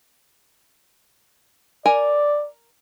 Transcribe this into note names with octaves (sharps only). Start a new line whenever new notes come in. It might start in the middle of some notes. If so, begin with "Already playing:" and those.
A#4 D5 G#5